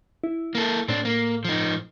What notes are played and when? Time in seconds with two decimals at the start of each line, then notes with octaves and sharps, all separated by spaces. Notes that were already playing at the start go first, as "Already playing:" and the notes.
0.24 E4
0.55 A#3 A4
0.88 A2 C4 D4
1.05 A#3
1.45 F3 D#4